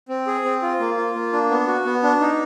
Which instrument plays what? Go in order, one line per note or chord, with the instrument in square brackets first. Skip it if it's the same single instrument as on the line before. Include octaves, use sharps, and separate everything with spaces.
[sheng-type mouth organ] C4
G#4
C4
F4
A#3
F4
A#3
D4
B3
F#4
B3
D4
D#4